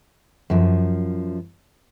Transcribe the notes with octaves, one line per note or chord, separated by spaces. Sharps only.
F#2 F3